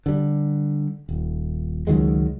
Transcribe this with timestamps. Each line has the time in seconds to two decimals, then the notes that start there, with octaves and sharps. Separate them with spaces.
0.06 D3 G3
1.09 D#1
1.87 C#2 D#3 F#3 G#3